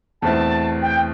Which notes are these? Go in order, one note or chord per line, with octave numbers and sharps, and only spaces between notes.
E2 B2 A3 C4 E4 A5
G5